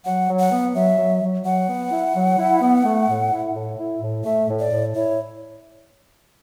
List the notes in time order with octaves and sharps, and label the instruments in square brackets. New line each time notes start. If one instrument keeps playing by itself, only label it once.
[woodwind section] F#3 [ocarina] F#5
[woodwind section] F#3
[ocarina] F#5
[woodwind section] B3
[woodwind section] F#3 [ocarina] E5
[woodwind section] F#3
F#3
[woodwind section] F#3 [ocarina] F#5
[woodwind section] B3
E4
F#3
E4
B3
A3
A2
E4
A2
E4
A2
[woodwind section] A3 [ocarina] E5
[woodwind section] A2
[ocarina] D5
[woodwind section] A2
[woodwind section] E4 [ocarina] C#5